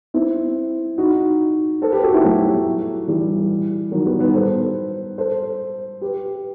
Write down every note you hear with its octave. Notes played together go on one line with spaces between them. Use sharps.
C4 E4
D#4 F#4
A4 C5
G4 B4
F#4 A4
E4 G4
F#3 A3
E3 G3
D#3 F#3
G3 B3
B3 D#4
A4 C5
A4 C5
G4 B4